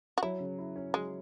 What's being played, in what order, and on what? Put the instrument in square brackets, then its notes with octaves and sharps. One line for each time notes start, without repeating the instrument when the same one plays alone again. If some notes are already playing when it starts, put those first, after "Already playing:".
[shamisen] F#4
[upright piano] F#3 [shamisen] E4
[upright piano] C#3
E4
C#4
[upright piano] F#3 [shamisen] G#3